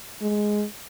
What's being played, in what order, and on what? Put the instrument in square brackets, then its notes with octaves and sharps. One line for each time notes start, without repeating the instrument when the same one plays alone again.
[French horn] G#3